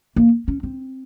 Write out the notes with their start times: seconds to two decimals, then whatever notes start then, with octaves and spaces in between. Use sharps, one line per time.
0.16 A#3
0.48 C#4
0.63 C4